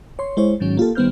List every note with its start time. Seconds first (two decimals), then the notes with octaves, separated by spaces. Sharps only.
0.19 C#5 C6
0.37 G#3 E4 C5 C#5
0.60 G#2 D#3 F#3 C#4
0.77 A#3 F4 G4 A4
0.95 D#3 G3 B3 C5 F6 G6